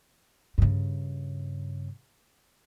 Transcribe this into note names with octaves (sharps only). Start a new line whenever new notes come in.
G2 C#3